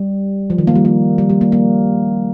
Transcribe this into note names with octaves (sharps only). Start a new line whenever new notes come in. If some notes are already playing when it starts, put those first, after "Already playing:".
Already playing: G3
F3
D#3
A#3
G3
A#3
G3
G3
A#3
A#3